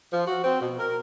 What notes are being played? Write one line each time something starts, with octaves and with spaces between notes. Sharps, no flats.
F3
F#4
C4
B2
A#4